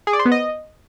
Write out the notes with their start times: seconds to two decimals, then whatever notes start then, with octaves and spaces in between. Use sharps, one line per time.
0.07 G#4
0.13 D5
0.19 C5
0.25 B3
0.32 D#5